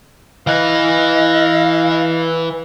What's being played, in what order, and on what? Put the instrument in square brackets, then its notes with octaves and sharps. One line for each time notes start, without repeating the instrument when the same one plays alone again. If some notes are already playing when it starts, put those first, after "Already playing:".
[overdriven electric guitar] E3 B4 [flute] D#5 [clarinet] F5